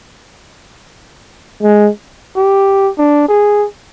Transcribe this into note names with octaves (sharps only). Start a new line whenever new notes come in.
G#3
G4
D4
G#4